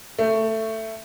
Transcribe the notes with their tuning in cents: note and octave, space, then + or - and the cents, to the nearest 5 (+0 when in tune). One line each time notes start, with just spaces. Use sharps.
A3 +10